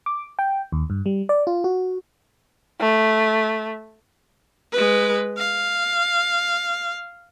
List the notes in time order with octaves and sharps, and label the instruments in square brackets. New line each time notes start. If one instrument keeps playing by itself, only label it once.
[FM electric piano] D6
G5
D#2
G2
G3
D5
F4
F#4
[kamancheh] A3
[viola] G#3 B4
F5